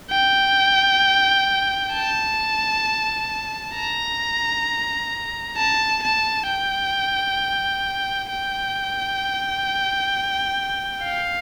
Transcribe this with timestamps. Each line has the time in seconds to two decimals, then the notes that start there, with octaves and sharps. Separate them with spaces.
0.11 G5
1.93 A5
3.75 A#5
5.57 A5
6.03 A5
6.47 G5
8.29 G5
11.03 F5